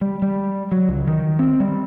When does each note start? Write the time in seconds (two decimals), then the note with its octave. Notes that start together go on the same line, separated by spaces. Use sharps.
0.01 G3
0.22 G3
0.72 F#3
0.89 C#2
1.07 D#3
1.39 C4
1.60 G3